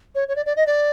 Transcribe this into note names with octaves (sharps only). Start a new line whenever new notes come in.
C#5
C#5
D5
D5
D#5
D5